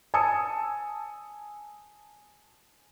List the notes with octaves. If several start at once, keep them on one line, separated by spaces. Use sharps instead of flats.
G#5 A5 D#6 E6 C#7